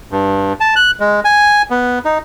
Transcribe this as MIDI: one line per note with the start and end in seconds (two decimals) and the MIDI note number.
0.12 0.53 43
0.60 0.75 81
0.76 0.91 90
1.00 1.20 56
1.25 1.62 80
1.70 1.99 59
2.05 2.18 63